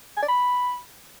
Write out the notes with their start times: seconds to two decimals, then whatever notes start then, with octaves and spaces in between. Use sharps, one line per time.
0.17 G#5
0.22 D5
0.28 B5